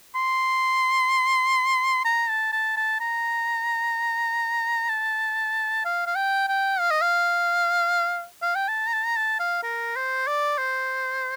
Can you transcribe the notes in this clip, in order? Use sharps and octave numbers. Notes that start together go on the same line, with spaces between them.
C6
A#5
A5
A5
A5
A#5
A5
F5
F5
G5
G5
F5
D#5
F5
F5
G5
A5
A#5
A5
A#5
A5
F5
A#4
C5
D5
C5